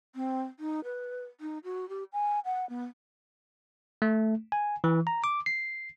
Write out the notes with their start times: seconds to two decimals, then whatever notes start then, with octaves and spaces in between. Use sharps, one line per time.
0.15 C4
0.60 D#4
0.84 B4
1.41 D#4
1.64 F#4
1.89 G4
2.13 G#5
2.45 F#5
2.69 B3
4.02 A3
4.52 G#5
4.84 E3
5.07 A#5
5.24 D6
5.46 C7